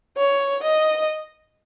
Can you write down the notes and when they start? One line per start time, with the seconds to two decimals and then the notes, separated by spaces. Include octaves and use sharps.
0.17 C#5
0.63 D#5